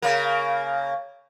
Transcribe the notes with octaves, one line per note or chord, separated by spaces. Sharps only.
C#3 A#3